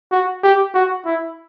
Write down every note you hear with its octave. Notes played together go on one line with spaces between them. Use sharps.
F#4
G4
F#4
E4